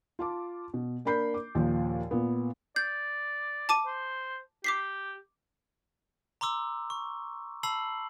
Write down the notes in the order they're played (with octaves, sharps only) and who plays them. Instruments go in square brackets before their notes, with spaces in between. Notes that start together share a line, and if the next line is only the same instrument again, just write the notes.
[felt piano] F4 A5 D6
B2
A#3 D4 A#4 B5 G6 C7
D6
D#2 A#2 F3
A#2 B3
[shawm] D5 [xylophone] G6
[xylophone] A5 D6 D#7
[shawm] C5
[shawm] G4 [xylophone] D6 B6 C7
[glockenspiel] A#5 C6 D6 E6
C#6
A5 B5 E6 C7 F#7